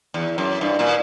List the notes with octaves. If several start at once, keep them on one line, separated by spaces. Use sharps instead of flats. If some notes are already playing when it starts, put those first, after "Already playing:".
E2
F#2
G2
A#2